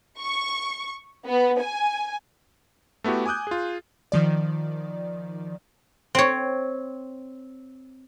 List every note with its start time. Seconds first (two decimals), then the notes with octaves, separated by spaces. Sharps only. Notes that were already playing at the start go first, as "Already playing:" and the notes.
0.18 C#6
1.27 B3
1.61 G#5
3.04 A3 B3 E4 F#4 G4
3.26 G#5 D6 D#6 F#6 G6
3.47 F4 G#4
4.12 D#3 F3 D5
6.15 C4 C#5